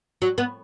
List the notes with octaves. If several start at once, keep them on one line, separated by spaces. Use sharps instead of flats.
F#3
B3